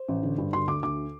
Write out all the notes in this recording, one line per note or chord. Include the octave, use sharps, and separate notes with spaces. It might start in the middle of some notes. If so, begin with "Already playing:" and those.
Already playing: C5
A1
D3
G2
D3 C6
D2 D6
D2 D6